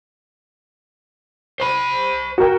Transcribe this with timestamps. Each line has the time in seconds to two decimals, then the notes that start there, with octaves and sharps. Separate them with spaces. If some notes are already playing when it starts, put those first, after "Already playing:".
1.60 C5 B5
2.38 F#4 A#4 G5